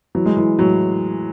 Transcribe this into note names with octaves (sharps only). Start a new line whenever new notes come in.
E3 F#3
G#3
E3
A2 F#3